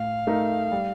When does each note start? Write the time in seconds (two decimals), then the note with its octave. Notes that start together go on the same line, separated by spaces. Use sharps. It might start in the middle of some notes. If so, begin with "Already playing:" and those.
Already playing: A2 F5
0.27 A3 D#4 A#4
0.72 G3